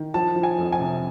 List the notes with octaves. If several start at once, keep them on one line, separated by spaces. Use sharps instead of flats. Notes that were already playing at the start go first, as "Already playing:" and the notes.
Already playing: D#3
F3 A5
F3
G#5
F2
G#5
C3